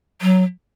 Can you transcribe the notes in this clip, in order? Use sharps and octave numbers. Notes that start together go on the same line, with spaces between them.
F#3